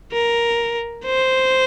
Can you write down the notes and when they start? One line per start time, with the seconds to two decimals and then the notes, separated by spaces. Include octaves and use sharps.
0.12 A#4
1.05 C5